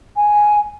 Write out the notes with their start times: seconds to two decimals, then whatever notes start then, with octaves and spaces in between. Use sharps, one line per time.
0.16 G#5